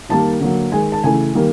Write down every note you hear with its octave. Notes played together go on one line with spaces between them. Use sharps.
D#3 G3 A#3 A5
D3 F#3 A#3
D#3 G#3 G#5
A5
C#3 E3 A3 G#5
D#3 G3 A#3